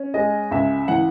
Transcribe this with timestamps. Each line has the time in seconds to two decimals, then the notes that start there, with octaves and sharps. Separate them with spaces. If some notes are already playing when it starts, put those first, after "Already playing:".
Already playing: C#4
0.14 G#3 D#5
0.51 C#2 E5
0.88 E3 F#5